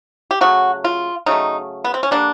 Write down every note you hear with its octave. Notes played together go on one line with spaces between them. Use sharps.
G4
C#3 F#3 A3 F#4
F4
C#3 F#3 A3 D#4
B3
C4
C#4
D3 G3 A#3 D4